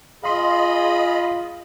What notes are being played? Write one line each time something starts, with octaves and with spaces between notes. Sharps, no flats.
F4 G#4 D#5 F5 B5 C6